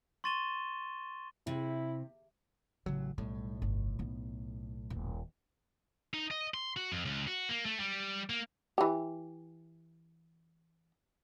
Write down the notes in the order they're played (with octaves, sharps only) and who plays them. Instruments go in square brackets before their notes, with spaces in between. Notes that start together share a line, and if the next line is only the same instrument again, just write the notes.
[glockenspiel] C6 C#6 A6 D#7 E7 G7
[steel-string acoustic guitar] C3 [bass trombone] E4
[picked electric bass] A1 F#3 [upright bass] C#3
[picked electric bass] B1 A2 [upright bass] G3
[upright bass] G1
B3 D#4
D#1
[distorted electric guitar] D#4
D#5
C6
F#4
F2
C#2
F#4
A#3
A3
G3
A#3
[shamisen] E3 G4